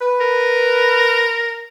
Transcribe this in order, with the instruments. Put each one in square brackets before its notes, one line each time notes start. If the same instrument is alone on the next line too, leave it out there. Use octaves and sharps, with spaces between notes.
[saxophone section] B4
[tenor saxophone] A#4